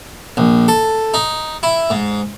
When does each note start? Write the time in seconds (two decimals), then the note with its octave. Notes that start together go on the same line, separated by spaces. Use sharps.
0.37 A#1
0.68 A4
1.14 D#4
1.63 E4
1.90 G#2